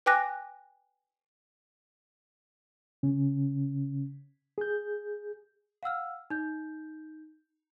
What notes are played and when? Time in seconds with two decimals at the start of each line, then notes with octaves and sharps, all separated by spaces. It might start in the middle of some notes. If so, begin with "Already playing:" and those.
0.06 B4 G5 G#5 D6 F#6 A#6
3.03 C#3 C#4
4.58 G#4 G6
5.83 F5 F#5 E6 F6
6.30 D#4 G6